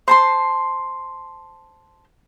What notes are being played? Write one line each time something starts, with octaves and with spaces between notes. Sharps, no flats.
C5 A5 C6